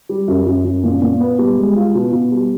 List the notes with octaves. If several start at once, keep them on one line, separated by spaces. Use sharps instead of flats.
G3
F#2
F#2
F#2
A#2
A#2
B3
G3
G#3
F4
B2
B2
G3